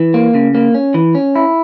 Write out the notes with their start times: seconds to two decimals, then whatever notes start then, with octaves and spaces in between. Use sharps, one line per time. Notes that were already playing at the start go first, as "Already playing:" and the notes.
Already playing: E3
0.14 A#3
0.35 C#3
0.55 A#3
0.74 C#4
0.94 E3
1.15 C#4
1.36 E4